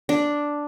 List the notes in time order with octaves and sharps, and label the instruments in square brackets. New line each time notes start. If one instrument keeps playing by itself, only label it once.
[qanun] D4